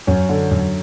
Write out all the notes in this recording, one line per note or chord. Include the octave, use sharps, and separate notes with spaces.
F#2 C#4
D3
F#2